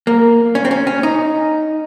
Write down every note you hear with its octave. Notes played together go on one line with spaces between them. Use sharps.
A#3
C#4
C4
C#4
C#4
D#4